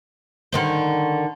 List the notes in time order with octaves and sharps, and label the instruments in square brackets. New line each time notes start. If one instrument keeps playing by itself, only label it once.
[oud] D3 D#3 C5